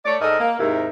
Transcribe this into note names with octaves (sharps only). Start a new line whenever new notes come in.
A3 C#5 D5
G#2 A4 A#4 D#5
A#3
D#2 G#2 C3 E4 A#4